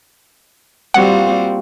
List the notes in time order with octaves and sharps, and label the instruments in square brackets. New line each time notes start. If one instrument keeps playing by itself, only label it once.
[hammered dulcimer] A#2 F4 C#6 [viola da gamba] G3 C4 F#4 [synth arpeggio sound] F#5